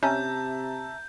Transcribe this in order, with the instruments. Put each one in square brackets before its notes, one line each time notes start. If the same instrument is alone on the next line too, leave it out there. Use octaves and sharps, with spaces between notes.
[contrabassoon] C3 [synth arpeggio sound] C#4 [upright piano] E5 A5 A#5 [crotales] G6